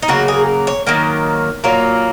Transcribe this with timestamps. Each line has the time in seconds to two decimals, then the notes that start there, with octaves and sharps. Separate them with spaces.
0.02 D#4
0.08 C#3 F#3 A#3 F#4
0.28 G#4
0.67 C#5
0.87 D#3 F#3 A#3
1.64 A#2 F#3 A#3